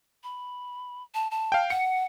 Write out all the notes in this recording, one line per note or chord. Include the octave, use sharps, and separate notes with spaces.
B5
A5
A5
F5 G5
F#5 C#7